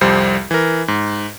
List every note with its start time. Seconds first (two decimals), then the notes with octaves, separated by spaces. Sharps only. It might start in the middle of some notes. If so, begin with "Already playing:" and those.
0.01 C2 F2 G3 C5
0.51 E3 A#4
0.88 G#2